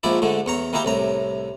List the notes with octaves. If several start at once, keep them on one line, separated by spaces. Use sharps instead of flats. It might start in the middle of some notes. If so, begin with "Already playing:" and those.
A#1 G#2 F3 E4 D5
G#2 D3 A3
E2 C#5 A#5
D#3 A#3 E4 G4 A#5
C2 A2 A#5